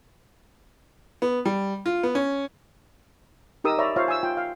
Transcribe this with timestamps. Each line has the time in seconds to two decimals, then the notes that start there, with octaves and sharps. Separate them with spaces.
1.22 B3
1.45 G3
1.86 F4
2.03 B3
2.15 C#4
3.64 D#4 G4 A#4 D#6 E6
3.78 C#5 D5 E5 A#5 B5
3.96 F4 C5 C#5 E5 F5
4.08 G#5 E6
4.23 F4 G5
4.37 F5